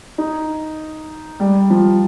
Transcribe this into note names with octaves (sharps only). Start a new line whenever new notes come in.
D#4
G3
F3